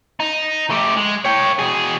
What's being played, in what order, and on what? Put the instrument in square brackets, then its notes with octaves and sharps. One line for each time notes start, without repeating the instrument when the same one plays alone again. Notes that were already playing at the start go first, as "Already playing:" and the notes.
[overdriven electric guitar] D#4
A3 G4
G#3
C#5 G5
B2 G#4